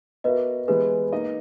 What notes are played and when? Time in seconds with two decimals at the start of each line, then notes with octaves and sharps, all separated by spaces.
0.24 B3 F#4 A#4 B4 D#5 E5
0.68 E3 G#3 B3 E4 G#4 B4
1.13 A#3 D#4 A#4 D#5